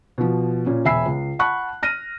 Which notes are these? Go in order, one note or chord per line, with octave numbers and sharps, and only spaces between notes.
B2 F3
A#2 C#4
E1 E5 G#5 B5 E6 C7
C#2
F#5 A5 B5 C#6 F#6
F6 A#6 D#7